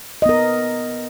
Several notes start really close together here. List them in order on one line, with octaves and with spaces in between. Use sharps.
D#5 B3 A#4